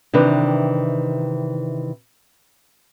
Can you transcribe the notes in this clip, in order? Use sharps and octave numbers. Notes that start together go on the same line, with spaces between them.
C3 D#3 E3 D4 B4